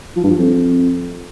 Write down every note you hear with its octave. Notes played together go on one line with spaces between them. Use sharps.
F3
G2
F3
F2